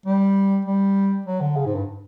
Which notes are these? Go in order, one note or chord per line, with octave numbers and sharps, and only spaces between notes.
G3
G3
F#3
D3
C#3
G#2
G2